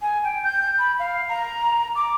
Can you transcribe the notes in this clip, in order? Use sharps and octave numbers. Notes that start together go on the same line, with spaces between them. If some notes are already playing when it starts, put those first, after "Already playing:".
G#5
G5
G6
B5
F5
A#5
D6